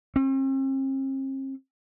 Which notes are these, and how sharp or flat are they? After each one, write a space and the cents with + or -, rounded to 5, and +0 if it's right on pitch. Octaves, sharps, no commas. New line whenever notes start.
C4 +45